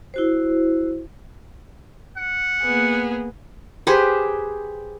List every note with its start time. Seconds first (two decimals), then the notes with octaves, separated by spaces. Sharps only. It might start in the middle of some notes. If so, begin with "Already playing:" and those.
0.14 E4 F#4 C5
2.17 F#5
2.63 A#3 B3 G#4
3.87 G4 G#4 B4 C5